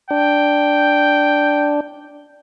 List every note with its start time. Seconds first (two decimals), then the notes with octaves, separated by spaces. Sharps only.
0.11 D4 G5